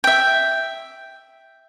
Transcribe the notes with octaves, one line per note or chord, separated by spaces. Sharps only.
E5 G5